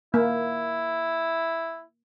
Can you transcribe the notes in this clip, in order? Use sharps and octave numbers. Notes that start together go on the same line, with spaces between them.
A#3 E4